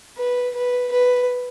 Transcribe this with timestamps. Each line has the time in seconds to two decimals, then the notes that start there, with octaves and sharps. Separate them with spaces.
0.18 B4
0.55 B4
0.92 B4